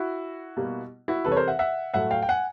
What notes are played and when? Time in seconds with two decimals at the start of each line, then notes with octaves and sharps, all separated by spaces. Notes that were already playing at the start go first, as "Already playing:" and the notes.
Already playing: E4 F#4
0.57 B2 G3 A#3
1.08 E4 F#4
1.25 C3 E3 G3 A4 B4
1.32 C#5
1.37 A#4 C5
1.48 E5 F#5
1.59 E5 F#5
1.94 A2 F#3 A3 E5 F#5
2.11 F5 G5
2.23 G5
2.29 F#5 G#5